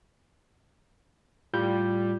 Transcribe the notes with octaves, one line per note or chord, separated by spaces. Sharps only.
A2 G3 F4 G6